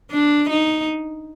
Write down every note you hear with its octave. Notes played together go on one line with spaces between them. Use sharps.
D4
D#4